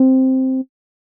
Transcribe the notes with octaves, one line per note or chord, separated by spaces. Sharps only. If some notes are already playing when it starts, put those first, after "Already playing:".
Already playing: C4